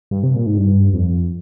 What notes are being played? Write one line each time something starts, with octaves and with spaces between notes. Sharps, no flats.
G2
C3
A#2
G#2
G2
F2